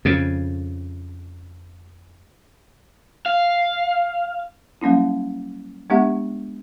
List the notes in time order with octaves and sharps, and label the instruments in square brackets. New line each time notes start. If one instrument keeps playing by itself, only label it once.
[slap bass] F2 C#3
[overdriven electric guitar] F5
[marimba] F#3 G3 A#3 C#4 E4
G#3 B3 D4 G4 E5 F#5